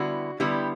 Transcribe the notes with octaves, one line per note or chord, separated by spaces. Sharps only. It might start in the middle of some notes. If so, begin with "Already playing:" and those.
Already playing: D3 G3 B3 E4 F#4
D3 G3 B3 E4 G4